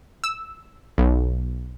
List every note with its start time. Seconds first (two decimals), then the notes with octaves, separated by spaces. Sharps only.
0.24 E6
0.98 B1